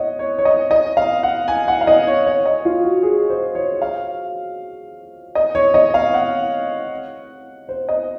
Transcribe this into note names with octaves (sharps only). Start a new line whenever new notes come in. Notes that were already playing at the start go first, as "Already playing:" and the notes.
Already playing: C#5 D#5 F#5
C#5
C#5
D#5
D#5
F5
F#5
G#5
F#5
F5
D#5
C#5
C#5
D#5
F4
F#4
G#4
C5
C#5
F5
D#5
C#5
D#5
F5
F#5
C5
D#5